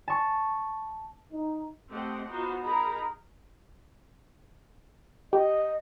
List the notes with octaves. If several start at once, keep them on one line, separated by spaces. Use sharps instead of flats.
A5 C#6
D#4
A3 C4 G4 A4 D#5 F#5
B3 D#4 F4 F#4 C5
D#4 G#4 A#4 A#5 B5
G4 D#5